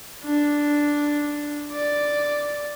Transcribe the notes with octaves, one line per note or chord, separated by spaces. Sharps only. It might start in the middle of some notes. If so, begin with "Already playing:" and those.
D4
D5